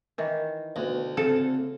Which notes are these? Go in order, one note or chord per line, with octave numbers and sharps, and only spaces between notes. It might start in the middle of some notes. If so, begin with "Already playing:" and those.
D#3 E3
D2 B2
C#3 C4 A4